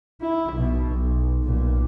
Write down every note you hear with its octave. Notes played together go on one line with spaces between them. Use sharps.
E4
B1 B2
B1
B1 A#2